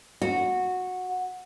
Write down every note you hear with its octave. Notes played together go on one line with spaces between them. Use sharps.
F#4